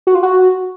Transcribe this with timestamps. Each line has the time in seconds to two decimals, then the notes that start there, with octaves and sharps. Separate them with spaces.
0.07 F#4
0.15 F4
0.23 F#4